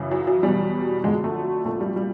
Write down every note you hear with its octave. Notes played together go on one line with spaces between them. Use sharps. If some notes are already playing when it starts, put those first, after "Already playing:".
Already playing: F#2 C#3 E3
F#3
F#3
E2 B2 F#3 G3
F2 D3 F#3 G#3
A3
C2 A#2 F3 A3
G3
G3